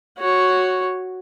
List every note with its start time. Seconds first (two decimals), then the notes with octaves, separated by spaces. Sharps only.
0.18 F#4 C#5